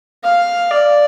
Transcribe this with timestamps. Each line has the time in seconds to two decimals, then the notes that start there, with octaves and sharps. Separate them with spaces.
0.24 F5
0.71 D5